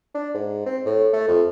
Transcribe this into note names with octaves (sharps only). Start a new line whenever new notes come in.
D4
G#2
C4
A2
A3
F2